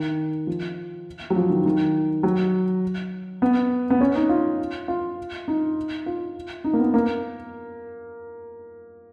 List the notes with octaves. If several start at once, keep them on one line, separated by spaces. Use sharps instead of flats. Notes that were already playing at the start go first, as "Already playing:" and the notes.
Already playing: D#3
F3
F#3
F3
D#3
D#3
F#3
B3
B3
C#4
D#4
F4
F4
D#4
F4
D#4
A#3
B3
A#3